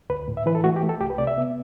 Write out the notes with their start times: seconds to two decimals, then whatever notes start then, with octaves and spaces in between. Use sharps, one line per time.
0.10 D2 B4
0.28 A2
0.37 E5
0.46 E3 B4
0.55 A4
0.64 A3 F#4
0.76 G4
0.83 A3
0.89 A4
1.00 C2 G4
1.10 B4
1.18 C3 D5
1.27 E5
1.38 B3